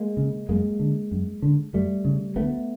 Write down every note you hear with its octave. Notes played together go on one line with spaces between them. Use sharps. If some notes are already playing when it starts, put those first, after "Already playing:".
Already playing: G#3 A#3
C#3
F#2 G#3 A#3
D3
F#2
D3
F#2 G3 A3
C#3
D2 A3 B3